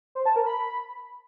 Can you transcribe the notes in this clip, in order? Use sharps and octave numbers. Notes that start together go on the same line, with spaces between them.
C5
A5
A#4
B5